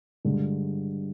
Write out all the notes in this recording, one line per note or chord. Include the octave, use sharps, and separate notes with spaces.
G2 D3 G#3